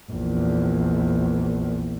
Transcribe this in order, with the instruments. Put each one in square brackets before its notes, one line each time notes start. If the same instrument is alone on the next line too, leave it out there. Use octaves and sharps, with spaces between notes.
[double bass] A#1 E2